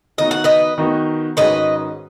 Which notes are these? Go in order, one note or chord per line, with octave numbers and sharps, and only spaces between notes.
D#3 B3 D#4 F#4 D#5
F#5
B4 D#5
D#3 B3 D#4 F#4
G#2 D#3 G#3 C#4 F#4 B4 D#5